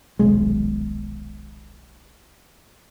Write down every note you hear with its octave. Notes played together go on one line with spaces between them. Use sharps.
D#1 B1 G#3